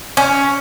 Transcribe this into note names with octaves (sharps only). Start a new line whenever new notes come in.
C#4